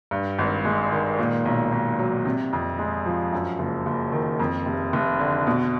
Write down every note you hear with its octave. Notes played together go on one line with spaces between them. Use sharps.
G2
G#1
G#3
D#3
A#2
B1
B1
F#3
C3
F2
G#3
F3
F#2
F#1
F#1
D#3
F2
F1
F1
D3
B2